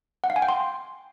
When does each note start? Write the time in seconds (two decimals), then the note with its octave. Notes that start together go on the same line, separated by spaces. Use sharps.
0.24 F#5
0.30 F5
0.36 G#5
0.42 G5
0.49 C6